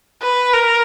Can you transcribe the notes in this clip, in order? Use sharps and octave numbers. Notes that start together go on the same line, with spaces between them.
B4
A#4